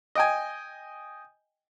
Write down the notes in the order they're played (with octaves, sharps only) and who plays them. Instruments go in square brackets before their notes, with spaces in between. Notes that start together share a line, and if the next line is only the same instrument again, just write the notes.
[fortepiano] D#5 G5 G#5